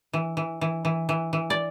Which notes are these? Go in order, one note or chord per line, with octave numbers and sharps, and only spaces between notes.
E3
E3
E3
E3
E3
E3
D5